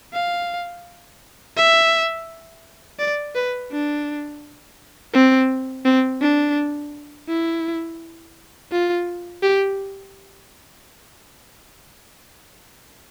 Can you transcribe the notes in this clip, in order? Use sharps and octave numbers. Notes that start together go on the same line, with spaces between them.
F5
E5
D5
B4
D4
C4
C4
D4
E4
F4
G4